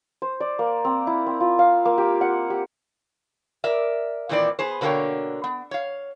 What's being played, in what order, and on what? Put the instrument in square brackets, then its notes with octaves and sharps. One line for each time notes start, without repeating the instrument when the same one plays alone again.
[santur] C5
D5
A#3
C4
E4
C4
F4
F5
A#3
G4
F#5
G4
[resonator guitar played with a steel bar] A#4 D5 E5
A#2 D#3 E3 C4 D#4 D5
B3 G#4 C5
B2 D3 A#3 D4 C#5 G5
B3
C#5 F5